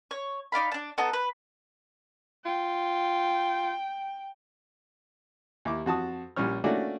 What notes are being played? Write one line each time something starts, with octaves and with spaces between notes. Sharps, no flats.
C#5
D#4 D5 F5 B5
D4 A5
B3 D#4 A4 A5
B4
F4 G5
D#2 E4 D6
F2 F#4 A5 D#6
A#1 G3 C#4 C#5 F6
A3 A#3 C#4 D4 F#4 D5